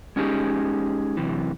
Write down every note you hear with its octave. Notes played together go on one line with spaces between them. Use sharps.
G#3 C#4 D#4 G4 G#4
F#2 C3 E3